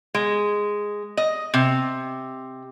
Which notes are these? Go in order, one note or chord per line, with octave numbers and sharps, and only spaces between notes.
G#3
D#5
C3